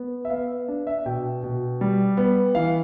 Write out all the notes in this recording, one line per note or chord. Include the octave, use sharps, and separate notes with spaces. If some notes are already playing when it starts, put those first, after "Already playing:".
Already playing: B3
E5
B3 F5
D4
E5
B2 G5
B2
G3
B3
E3 F5